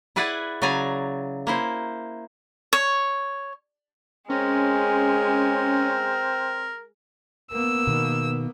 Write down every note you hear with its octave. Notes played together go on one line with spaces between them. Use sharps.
E4 G#4 B4 D5 E5 F#5
C#3 F#3 D5 G#5 A#5
A#3 E4 C5
C#5
G#3 C4 C#4 A#4
A#3 B3 E6
B2 D#3